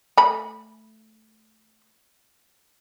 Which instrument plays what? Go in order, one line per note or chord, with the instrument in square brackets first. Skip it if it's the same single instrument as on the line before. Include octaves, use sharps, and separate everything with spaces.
[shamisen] A3 B5